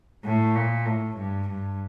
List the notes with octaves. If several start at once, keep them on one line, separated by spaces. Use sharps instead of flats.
A2
A#2
A2
G2
G2